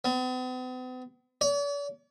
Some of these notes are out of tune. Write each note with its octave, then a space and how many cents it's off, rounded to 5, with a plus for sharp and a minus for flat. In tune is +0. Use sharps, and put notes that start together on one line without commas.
B3 +45
D5 -45